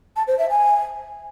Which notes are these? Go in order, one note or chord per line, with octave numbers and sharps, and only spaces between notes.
A5
C5
E5
G#5